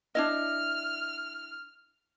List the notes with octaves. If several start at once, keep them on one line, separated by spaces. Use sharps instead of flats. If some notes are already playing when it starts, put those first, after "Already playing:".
D4 E4 D#5 F6